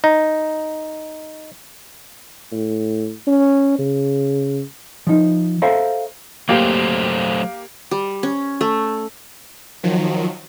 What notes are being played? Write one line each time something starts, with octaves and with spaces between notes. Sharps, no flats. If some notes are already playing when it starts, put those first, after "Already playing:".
D#4
A2
C#4
C#3
F3 D#4
A4 C5 E5 F5 G5 A#5
F#3 A3 A#3 G4 C5
G3
C#4
A3
D#3 F3 F#3